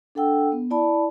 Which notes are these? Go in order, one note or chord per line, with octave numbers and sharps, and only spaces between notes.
D4 A4 F#5 G5 E6
B3
E4 D5 A5 B5